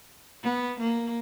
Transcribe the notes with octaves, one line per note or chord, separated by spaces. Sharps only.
B3
A#3